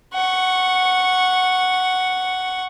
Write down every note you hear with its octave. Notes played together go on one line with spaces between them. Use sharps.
F#5 C#6